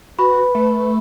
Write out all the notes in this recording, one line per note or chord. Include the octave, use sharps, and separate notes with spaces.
F#4 B4 B5
A3